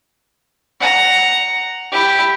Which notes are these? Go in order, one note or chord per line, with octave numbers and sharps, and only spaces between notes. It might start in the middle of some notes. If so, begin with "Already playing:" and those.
F#5 A#5
E4 G4